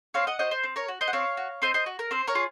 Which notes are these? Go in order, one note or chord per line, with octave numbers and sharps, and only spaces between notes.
C4 C#5 F5
D#5 F#5
F#4 C5 D#5
C5
C4
A#4 C#5
F#4
C5 D#5
F#5
C4 C#5 F5
F#4
C4 C5 D#5
C5 D#5
F#4
A#4
C4 C5
A#4 C#5
F4 G#4